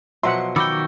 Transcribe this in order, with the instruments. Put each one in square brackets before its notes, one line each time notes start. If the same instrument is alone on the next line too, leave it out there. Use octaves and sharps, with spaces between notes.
[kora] B2 F3 F#3 [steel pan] E5 F#5 [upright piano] C6
[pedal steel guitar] D#3 F#4 G5 [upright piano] B5 D6 E6